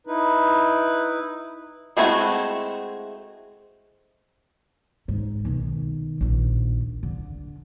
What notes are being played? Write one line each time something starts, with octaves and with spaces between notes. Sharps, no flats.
D#4 E4 B4
G#3 A3 C4 E4 F#4
G#2
B1 D#3
A#1 D#2
D3